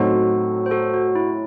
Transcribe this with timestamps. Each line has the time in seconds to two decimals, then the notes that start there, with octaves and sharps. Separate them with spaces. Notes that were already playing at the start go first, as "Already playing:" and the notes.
Already playing: A2 F#3 C4 D#4 F#4 A4
0.66 C5
0.71 F#4 A4
0.94 F#4
1.15 E4